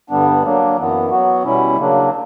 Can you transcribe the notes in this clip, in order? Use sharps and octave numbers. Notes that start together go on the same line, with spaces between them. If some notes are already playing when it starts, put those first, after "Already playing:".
G2 D3 G3 B3 D4
F#3 A#3 D4
F#2 E3 B3
F#3 B3 F#4
B2 G3 C#4 E4
C#3 F#3 A#3 D4